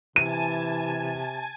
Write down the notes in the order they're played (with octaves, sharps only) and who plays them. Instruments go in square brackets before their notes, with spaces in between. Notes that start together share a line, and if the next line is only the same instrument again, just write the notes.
[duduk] C3 [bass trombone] E3 [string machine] G#5 A5 [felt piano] D#7